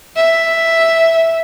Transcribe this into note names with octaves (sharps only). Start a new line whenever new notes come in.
E5